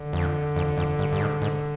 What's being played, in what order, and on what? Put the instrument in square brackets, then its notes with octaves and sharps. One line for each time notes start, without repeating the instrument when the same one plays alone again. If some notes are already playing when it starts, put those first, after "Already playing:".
Already playing: [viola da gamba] D3
[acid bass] F2
F2
F2
G2
G2
G#2
G#2